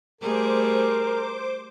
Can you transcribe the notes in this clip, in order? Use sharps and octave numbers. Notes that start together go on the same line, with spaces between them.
G3 A3 G#4 A#4 C5 D6